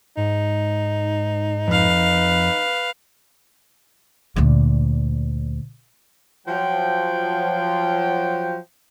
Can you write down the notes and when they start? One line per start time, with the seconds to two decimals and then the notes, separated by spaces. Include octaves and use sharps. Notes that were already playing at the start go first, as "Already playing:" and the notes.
0.17 G#2 D#4
1.68 F2 B4 F5
4.36 D2 A#2
6.47 F3 F#3 G5